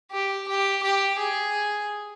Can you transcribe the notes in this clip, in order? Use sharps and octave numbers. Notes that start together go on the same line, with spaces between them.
G4
G4
G4
G#4